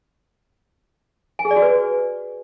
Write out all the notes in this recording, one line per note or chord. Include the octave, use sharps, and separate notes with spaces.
G#5
G#4
D5
F#4
B4